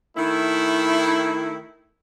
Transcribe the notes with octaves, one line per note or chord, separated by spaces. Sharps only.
D#3 A3 E4